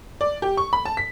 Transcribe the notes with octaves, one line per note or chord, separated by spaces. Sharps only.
D5
G4
C#6
B5
A5
B6